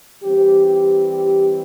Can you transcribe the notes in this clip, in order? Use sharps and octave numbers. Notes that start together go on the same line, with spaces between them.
E3 G3 C4 G4
G4
G4